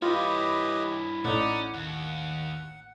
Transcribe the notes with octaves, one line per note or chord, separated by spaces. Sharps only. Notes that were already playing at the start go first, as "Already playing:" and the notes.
G2 E4 F4 G4 B4 C#5 D#5
A1 A2 C#4 D#4 D5 F#5
D#2 F#5